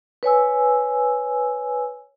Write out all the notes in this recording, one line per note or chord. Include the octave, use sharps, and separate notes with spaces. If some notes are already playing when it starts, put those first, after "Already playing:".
B4 C#5 G#5 E6